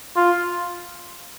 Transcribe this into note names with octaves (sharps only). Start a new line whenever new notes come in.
F4